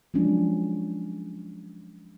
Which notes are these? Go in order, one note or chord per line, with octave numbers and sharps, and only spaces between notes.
F3 F#3 G#3 C#4 D4